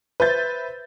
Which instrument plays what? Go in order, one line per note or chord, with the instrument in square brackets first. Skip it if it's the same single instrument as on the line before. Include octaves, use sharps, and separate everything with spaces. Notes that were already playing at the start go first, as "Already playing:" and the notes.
[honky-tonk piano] B4 C5 E5 G6 A6